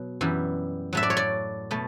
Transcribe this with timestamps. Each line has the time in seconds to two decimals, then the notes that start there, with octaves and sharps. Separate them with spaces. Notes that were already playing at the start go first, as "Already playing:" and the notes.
Already playing: B2 F#3
0.21 F#2 E3 G3
0.93 A2 F#3 A3 E5
1.03 D5
1.10 C#5
1.17 D5
1.71 B2 A3